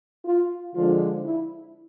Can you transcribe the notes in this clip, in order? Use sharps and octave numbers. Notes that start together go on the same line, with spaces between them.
F4
D3 F3 G#3 F4
E4